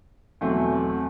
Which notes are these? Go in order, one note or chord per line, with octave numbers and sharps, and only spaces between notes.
E2 B2 F#3 A3 C4